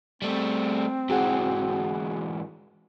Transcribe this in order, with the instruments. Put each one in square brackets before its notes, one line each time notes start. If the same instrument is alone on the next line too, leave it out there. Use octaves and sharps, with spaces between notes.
[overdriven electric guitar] G3 A3 [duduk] C4
[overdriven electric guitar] G#2 E3 [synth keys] F#4 G#4 F#5